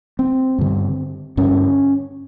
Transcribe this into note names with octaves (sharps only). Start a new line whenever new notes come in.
C4
G2 D3
G2 D3 C#4